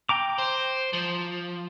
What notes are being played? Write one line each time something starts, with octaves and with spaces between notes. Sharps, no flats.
G5 A#5 D6
C5
F3